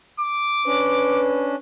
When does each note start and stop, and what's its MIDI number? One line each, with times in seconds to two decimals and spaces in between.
0.20 1.22 86
0.66 1.56 61
0.66 1.56 62
0.66 1.58 71